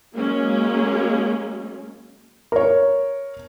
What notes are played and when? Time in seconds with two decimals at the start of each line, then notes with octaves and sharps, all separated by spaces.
0.15 F#3 G#3 A#3 C#4
2.52 A#4 C#5